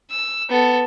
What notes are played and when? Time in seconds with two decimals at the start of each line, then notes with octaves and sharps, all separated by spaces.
0.11 E6
0.49 B3 A4